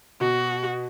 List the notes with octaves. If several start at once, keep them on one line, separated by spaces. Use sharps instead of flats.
B2 F#4